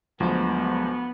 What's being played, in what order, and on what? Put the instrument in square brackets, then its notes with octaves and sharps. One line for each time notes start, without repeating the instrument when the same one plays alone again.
[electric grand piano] D2 F3 [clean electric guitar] F#3 G#3 [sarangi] B3